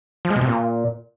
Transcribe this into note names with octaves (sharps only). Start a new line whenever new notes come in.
F3
G#3
B2
C3
A#2